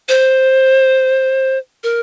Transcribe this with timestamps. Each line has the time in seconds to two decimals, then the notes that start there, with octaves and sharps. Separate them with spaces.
0.09 C5
1.83 A#4